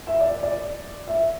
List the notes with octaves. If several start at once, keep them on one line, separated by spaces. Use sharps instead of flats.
E5
D5
D5
E5